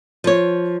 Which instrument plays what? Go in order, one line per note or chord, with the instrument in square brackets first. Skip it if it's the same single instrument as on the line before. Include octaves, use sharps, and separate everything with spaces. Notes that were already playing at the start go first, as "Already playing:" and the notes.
[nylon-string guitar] F3 C#5